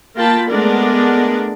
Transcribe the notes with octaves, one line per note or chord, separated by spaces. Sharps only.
A#3 F4 A#4 G5 A5 B5
G#3 A3 B3 D4 A#4 D5